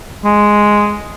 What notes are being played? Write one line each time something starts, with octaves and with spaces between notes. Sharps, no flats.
G#3